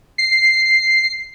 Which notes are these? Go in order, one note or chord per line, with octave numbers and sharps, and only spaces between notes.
C7